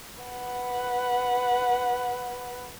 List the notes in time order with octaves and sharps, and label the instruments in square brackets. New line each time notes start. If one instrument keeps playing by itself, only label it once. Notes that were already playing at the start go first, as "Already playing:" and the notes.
[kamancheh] B4 F#5